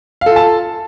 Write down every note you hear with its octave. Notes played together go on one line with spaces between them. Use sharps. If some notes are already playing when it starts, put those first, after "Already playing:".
F4 A4 F5 A5